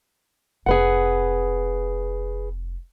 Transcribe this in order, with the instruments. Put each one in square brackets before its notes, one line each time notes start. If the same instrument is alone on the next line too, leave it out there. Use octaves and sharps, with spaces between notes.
[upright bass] F1 C4 [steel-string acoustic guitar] G#4 B4 F#5